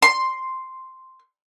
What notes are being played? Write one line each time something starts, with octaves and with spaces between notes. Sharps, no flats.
C6